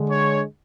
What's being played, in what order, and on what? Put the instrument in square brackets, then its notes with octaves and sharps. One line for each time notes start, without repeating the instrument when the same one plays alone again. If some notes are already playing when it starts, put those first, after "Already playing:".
Already playing: [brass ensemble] D3 G#3
C#5